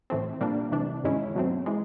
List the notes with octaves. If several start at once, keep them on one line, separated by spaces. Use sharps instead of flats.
A2 E3 A3 C4
A#2 G3 A#3 D4
C3 E3 A3 D4
G2 D#3 G#3 C#4 E4
B2 F#3 A3 C4
E3 G#3